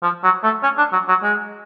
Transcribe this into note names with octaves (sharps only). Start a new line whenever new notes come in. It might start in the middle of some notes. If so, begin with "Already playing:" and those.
F3
F#3
A3
C#4
D4
F#3
F#3
G#3